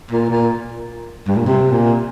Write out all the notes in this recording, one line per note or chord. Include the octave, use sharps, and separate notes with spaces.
A#2
A#2
G2
A#2
C3
A#2